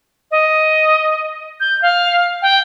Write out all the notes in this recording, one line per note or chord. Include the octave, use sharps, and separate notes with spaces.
D#5
G6
F5
G5